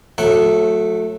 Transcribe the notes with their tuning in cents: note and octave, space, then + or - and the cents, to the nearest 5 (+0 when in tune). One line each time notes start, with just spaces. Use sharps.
F#3 -35 A3 +0 F#5 +0